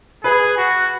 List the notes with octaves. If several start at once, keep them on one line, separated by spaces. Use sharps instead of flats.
G#4 B4
F#4